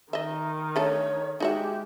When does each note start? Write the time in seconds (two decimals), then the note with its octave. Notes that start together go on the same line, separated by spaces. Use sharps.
0.13 D#3 D#5 E5
0.76 D3 A3 A4 C#5
1.40 G#3 D#4 F#4 G4 E5